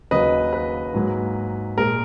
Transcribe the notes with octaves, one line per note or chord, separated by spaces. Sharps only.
D#2 C#3 F#3 A#3 B4 D#5
B4
G#2 F#3 A#3
A#2 G#3 A#4